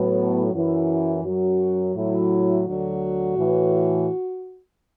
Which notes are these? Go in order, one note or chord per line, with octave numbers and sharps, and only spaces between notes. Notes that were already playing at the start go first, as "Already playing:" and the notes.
Already playing: A2 F#3 B3
F#2 E3 E4
F#2 F#3 F#4
A2 F#3 E4
D2 D3 F#3 F#4
A2 E3